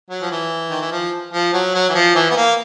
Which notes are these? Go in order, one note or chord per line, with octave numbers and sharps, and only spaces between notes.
F#3
F3
E3
D#3
E3
F3
F3
F#3
F#3
E3
F3
E3
B3
A#3